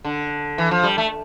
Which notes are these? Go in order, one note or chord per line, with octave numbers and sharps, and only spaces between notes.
D3
E3
F3
G3
A3